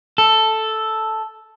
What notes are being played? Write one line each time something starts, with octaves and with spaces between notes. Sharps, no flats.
A4